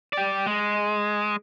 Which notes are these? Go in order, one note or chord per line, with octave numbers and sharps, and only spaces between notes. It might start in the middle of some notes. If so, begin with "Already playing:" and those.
G4 D5
G#3